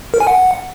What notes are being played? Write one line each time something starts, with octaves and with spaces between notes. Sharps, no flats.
A#4
G#5
F#5